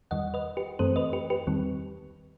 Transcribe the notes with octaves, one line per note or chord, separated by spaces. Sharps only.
E2 D#3 G3 D#5 F#5
B4 D#5
G4 B4
F#2 E3 A3 C4 A4 C5
B4 D#5
G4 B4
G4 B4
E2 D#3 G3 C4